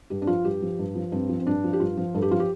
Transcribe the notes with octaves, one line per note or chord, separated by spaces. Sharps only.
G2 G4
D4
F3 F4
G2 G4
F3
G2
F3
G2 C4
F3
C4
G2 D4
F3
G4
G2 F4
F3
G2 A4
G4
F3 F4
G4